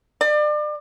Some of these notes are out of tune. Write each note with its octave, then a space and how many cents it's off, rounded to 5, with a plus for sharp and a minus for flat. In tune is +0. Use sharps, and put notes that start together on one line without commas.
D5 +35